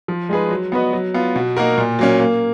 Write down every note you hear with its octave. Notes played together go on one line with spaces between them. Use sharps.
F3
G#3 D#4 G#4 B4
F#3
B3 F#4 B4 D#5
F#3
B3 F4
B2
A#3 D#4 F#4 A#4
A#2
F#3 A#3 C#4
A#3